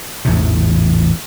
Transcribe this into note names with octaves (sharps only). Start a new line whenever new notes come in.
A1 E2 G#2 C3